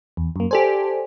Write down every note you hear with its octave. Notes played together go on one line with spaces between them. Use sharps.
E2
F#2 A#3
G4 A4 C5 D5 G#5